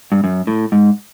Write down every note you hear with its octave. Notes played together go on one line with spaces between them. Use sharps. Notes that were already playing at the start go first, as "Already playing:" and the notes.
G2
F#2
A2
G#2